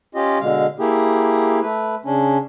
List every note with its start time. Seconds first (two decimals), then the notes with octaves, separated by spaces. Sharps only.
0.15 C#4 F4 G4 D#5
0.41 B2 D3 G#3 F5
0.79 A#3 E4 G4 G#4
1.62 A3 B4
2.05 C#3 C#4 D4